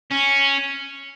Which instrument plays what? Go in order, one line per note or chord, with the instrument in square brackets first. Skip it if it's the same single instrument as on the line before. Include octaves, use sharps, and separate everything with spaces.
[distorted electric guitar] C#4